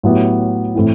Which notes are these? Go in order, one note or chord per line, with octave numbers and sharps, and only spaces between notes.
A2 F#3 B3 E4 G4
A2 E3 A3 C4 E4